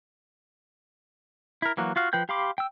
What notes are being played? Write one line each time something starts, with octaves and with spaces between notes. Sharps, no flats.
E4 A#4
E3 F#3 A#3 F#4
F4 F#4 F5
F3 B4 G5 G6
G4 F5 B5 C6 D6
G5 E6